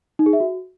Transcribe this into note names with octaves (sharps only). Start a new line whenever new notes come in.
D#4
G#4
E5
F#4